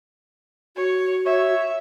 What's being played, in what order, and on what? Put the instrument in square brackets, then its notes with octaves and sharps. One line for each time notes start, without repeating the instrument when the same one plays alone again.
[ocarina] F#4 [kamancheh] C#5
[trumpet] C#5 [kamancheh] E5